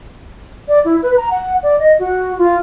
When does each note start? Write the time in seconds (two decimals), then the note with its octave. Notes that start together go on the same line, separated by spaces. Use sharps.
0.68 D5
0.85 E4
1.03 B4
1.17 A#5
1.30 F#5
1.63 D5
1.79 D#5
1.99 F#4
2.38 F4